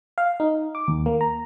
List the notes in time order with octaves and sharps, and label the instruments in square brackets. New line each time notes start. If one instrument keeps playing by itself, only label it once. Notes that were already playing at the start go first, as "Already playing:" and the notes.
[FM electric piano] F5
D#4
D6
D#2
A#3
A#5